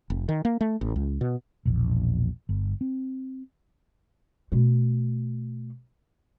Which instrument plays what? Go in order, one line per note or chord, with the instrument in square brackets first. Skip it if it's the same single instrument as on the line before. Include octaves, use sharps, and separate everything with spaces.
[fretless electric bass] F1
D#3
A#3
A3
A1
C#2
B2
E1 A#1
G1
C4
[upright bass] B2 A3